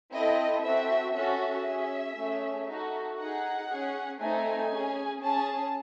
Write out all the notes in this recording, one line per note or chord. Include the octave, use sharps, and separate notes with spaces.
C4 E4 A4 D#5
C4 F#4 A4 E5
C#4 F#4 A4 E5
C#4 G#4
A3 C#4 G#4
D#4 F#4 A4
D#4 G#4 F#5
C#4 G#4
A3 C4 D#4 A4 G#5
C#4 G#4
C#4 G#4 A5